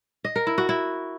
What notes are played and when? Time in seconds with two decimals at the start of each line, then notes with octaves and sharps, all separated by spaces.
0.25 D#5
0.36 A#4
0.47 E4
0.58 F#4
0.69 E4